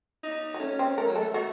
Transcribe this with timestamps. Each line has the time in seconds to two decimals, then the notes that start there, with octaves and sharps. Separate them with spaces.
0.23 D#4
0.54 F#3
0.60 A3 C#4
0.79 C4
0.97 A3 A#4
1.07 F#3
1.16 A3 A4
1.34 A3 F#4